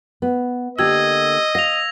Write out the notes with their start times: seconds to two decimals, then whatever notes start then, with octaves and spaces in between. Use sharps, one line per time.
0.22 B3
0.79 D3 A#3 G4 D#5 E6 G#6
1.55 F5 A#6 F7